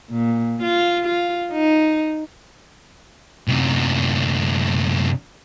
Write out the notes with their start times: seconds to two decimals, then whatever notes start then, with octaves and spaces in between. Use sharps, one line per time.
0.11 A#2
0.62 F4
1.04 F4
1.52 D#4
3.49 F#2 C3